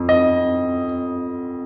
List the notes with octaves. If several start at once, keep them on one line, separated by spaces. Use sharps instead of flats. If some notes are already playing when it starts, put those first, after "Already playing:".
Already playing: F2 F3
D#5